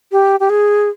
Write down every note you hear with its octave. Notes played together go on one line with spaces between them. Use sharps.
G4
G4
G#4